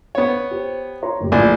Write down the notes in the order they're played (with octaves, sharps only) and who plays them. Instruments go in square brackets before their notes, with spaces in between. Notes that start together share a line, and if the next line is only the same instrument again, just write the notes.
[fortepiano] B3 C#5
[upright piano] G4 C5
C#5 A#5 C6
F#1 A2 G4
[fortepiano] A#1 D5 G#5 [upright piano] A2 E3 F3